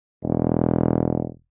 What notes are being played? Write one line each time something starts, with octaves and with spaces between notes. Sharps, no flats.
E1